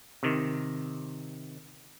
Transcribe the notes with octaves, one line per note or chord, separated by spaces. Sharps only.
C3 D#3